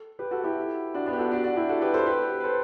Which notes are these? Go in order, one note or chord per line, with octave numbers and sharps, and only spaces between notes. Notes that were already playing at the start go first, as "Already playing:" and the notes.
Already playing: A4
G4 B4
F#4 A4
E4 G4
D4 F#4
B3 D4
G4
F#4 A4
D4 F#4
D4 F#4
E4 G4
F#4 A4
G4 B4
A4 C5
G4 B4
B4
A4 C5